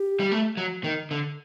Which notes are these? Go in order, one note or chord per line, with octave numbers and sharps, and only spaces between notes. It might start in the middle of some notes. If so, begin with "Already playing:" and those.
Already playing: G4
G3
A3
F#3
D#3
D3